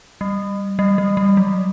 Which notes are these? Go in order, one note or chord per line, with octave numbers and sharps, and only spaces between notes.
G3
G3
G3
G3
F#3